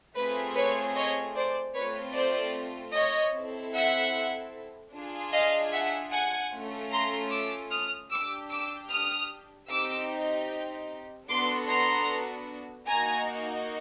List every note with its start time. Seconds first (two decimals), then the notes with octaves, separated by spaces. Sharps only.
0.16 A3 C4 F4 G#4 B4
0.55 B4 C#5
0.95 C#5 D#5
1.35 C5 D5
1.74 A3 C4 F4 B4 C#5
2.14 C5 D5
2.93 C#5 D#5
3.34 C4 E4 A4
3.74 E5 F#5
4.93 D4 F4 G#4
5.32 D#5 F5
5.71 E5 F#5
6.11 F#5 G#5
6.52 A3 C#4 F4
6.91 A#5 C6
7.30 D6 E6
7.70 D#6 F6
8.11 D4 G4 D6 E6
8.50 D6 E6
8.90 D#6 F6
9.69 C4 D#4 G4 D6 E6
11.28 B3 D4 F#4 A4 C6 D6
11.67 A#5 C6
12.87 A#3 D#4 F#4 G#5 A#5